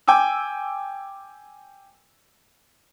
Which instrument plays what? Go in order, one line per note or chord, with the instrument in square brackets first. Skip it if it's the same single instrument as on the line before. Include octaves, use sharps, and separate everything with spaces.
[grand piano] G5 G#5 D6 E6